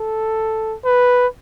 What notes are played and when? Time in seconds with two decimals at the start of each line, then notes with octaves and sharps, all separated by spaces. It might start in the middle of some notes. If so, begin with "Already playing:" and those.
Already playing: A4
0.85 B4